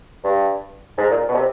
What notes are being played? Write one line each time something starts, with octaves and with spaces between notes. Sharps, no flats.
G2
G#2
A#2
B2
C3